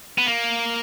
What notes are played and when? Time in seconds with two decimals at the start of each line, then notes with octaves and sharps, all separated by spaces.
0.18 B3
0.26 A#3